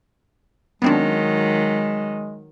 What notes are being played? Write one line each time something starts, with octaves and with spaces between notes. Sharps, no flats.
D#3 F#3 G#3 B3 C4 D4